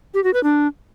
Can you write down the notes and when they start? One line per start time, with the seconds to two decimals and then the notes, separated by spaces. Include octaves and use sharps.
0.14 G4
0.24 F#4
0.34 B4
0.43 D4